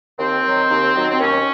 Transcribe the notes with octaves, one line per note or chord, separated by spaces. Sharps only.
D#2 C4
D#3 F#3
D#2
D#3 F#3
C4
D#2 C#4